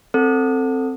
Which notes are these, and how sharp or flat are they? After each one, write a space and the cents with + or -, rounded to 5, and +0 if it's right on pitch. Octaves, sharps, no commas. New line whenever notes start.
C4 +0 A4 +15